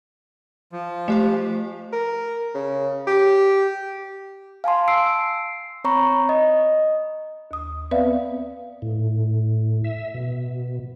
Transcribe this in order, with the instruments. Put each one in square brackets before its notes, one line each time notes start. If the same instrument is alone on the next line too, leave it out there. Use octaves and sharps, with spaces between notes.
[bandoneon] F3
[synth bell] A3 G4 C5
[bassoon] A#4
C#3
G4
[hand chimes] F5 G#5 A5 C6
E6 C7 D7
C4 C#5 A#5 B5 C#6
D#5
[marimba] D#2 D#6
B3 C4 B4 D5 E5 F5
[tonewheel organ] A2
E5
B2